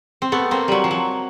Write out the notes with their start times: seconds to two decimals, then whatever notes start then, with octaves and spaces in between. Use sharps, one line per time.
0.22 C4
0.32 A3 B3
0.51 A#3 C4
0.68 F#3 G3
0.84 F3
0.91 F#3